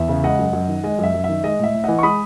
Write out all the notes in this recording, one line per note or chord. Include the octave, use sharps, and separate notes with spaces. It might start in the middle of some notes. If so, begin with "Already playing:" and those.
Already playing: E2 E5
C#3
G#3 D#5 F#5
F#2
F#2
D#3
G#3 D#5
F#2 E5
F#2
D#3 E5
G#3 D#5
A2 E5
A2
E3 D#5 F#5
C#6
G#3 B5 D#6